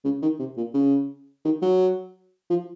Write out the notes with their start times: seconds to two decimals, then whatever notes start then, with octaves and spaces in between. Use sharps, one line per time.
0.05 C#3
0.22 D#3
0.39 C3
0.57 A#2
0.74 C#3
1.45 D#3
1.62 F#3
2.50 F3